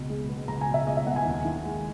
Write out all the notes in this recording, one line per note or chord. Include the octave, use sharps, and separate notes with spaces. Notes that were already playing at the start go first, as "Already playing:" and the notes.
Already playing: C#2 B2
G#3
B3
C#2 A#5
G#5
B2
E5
G#3 D#5
E5
B3 F#5
G#5
D#2
D#3
G#3